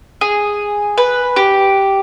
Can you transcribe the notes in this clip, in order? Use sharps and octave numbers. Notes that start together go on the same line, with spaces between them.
G#4
B4
G4